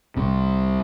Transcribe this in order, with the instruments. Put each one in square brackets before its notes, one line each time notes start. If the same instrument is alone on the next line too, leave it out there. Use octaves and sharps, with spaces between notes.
[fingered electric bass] C2 C3